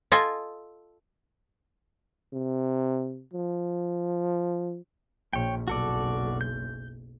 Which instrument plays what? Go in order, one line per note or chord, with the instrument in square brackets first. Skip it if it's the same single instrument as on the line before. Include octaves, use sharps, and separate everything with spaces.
[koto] F4 A4 D#5 G#5
[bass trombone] C3
F3
[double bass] A#1 [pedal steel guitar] C#5 G5
[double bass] F#1 B1 [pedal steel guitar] F#4 A4 D5
[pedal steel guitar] G6